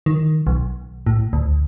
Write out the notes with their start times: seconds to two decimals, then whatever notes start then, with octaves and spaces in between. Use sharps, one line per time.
0.06 D#3
0.47 B1
1.06 A2
1.33 D2